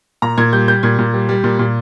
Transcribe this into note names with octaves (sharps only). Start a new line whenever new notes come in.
A#2 A#5
A#2 G#6
G3 G6
G3 G6
A#2 G#6
A#2
G3
G3
A#2
A#2